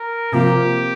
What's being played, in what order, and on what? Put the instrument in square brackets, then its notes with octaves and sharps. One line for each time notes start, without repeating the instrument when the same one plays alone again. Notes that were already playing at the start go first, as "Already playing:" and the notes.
Already playing: [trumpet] A#4
[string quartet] C3 F3 A#3 [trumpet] G4